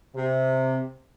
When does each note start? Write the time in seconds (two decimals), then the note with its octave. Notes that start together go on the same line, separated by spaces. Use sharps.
0.16 C3